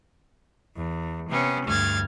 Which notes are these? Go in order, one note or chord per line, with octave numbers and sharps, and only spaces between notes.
E2
C3 B3 C#4
D2 G2 F6 G#6 A6